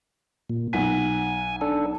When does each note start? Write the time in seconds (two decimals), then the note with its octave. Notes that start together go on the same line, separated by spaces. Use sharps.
0.50 A#2
0.73 B1 F#5 G#5 B6
1.61 D4 A4